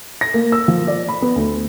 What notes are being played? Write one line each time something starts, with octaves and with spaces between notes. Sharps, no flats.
A#6
A#3
E6
F3
D5
B5
B3
D2